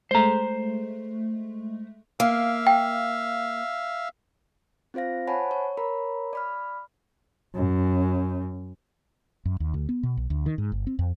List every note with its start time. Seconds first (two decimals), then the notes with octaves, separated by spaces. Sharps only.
0.11 G#3 A3 C5 A#5
2.20 A#3 E5 F5
2.67 G5
4.94 C4 F4 C5 F5 A#6
5.27 C5 C#5 F#5 G#5 A5 B5
5.51 C#5
5.77 A#4 C#5 A#5 B5
6.33 D5 B5 F6
7.55 F#2
9.45 F#2
9.60 D#2
9.74 D2
9.89 B3
10.03 B2
10.17 B1
10.30 D2
10.46 D#3
10.58 G#2
10.72 G1
10.87 C4
10.99 F2